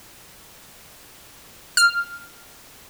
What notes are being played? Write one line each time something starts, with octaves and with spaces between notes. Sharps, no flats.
F6